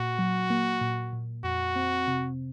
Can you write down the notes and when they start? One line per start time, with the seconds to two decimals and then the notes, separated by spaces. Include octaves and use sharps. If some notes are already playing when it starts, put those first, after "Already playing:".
Already playing: A#2 F#4
0.19 F#3
0.50 A#3
0.81 A#2
1.13 A#2
1.44 F2 F#4
1.76 C4
2.08 C3